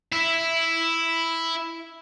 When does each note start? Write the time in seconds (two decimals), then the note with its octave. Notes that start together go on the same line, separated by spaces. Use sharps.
0.12 E4 E5